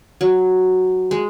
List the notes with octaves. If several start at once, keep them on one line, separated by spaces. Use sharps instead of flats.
F#3
G#3